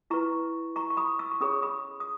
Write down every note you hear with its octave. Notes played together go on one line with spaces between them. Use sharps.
E4 B4 A#5 C#6
A#5 C#6
C#6
B5 D#6
C#6 E6
C#6
C#4 G#4 C#5 B5 D#6
B5 D#6
D#6